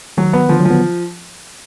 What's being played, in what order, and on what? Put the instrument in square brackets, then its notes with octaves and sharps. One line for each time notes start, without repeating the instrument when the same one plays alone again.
[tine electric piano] D#3 [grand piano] F#3
[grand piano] B3
[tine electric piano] D3 [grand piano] F3
[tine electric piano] F#3
[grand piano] F3
[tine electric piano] B3